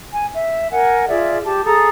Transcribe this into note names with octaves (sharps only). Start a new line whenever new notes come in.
G#5
E5
A#4 F#5 G#5
F4 G#4 D5 E5
G4 A5
G#4 A4 A#5 D#6